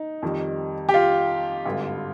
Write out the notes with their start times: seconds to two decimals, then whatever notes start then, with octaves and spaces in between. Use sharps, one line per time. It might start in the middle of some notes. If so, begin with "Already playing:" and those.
Already playing: D#4
0.22 F2 D#3 G3
0.89 G4
0.94 F4
1.65 G#1 G2 D3